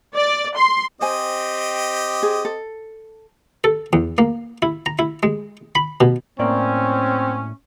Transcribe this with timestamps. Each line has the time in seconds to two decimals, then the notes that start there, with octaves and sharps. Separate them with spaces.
0.15 D5
0.57 C6
1.01 C4 G4 C5 D#5 G#5
2.23 G#4
2.45 A4
3.64 A4
3.93 E2
4.18 A#3
4.62 E4
4.86 A#5
4.99 E4
5.23 G#3
5.75 B5
6.01 B2
6.39 A2 A#3 C4 C#4 D5